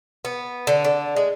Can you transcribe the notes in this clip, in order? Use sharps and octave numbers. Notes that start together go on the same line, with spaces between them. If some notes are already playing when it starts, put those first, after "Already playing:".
B3
D3
D3
G#3